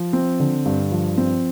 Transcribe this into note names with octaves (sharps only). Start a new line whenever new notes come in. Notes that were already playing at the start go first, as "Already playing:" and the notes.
Already playing: F3
C4
D3
G2
F3
C4